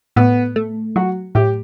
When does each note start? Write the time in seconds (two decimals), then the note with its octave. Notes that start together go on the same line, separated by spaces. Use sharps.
0.16 A2 B3
0.56 A3
0.96 F#3 F#4
1.35 A2 G4